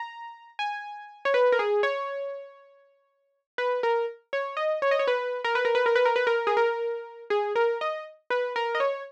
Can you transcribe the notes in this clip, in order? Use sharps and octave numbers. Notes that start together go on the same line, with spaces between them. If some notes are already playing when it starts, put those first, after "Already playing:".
Already playing: A#5
G#5
C#5
B4
A#4
G#4
C#5
B4
A#4
C#5
D#5
C#5
D#5
C#5
B4
A#4
B4
A#4
B4
A#4
B4
A#4
B4
A#4
G#4
A#4
G#4
A#4
D#5
B4
A#4
D#5
C#5